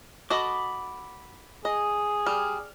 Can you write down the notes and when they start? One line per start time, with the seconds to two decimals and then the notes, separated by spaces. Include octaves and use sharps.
0.30 F#4 A4 D#5 B5 D6
1.65 G#4 D#5
2.26 G3 F6